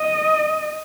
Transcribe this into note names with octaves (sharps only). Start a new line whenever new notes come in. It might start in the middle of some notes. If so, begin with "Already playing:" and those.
Already playing: D#5